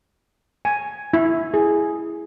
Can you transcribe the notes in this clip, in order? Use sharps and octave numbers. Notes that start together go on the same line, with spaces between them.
G#5
E4
G#4